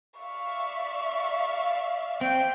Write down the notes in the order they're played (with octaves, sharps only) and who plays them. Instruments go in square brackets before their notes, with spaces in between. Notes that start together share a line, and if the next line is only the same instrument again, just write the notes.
[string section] D5 E5 F5 [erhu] C#6
[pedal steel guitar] C4 [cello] G5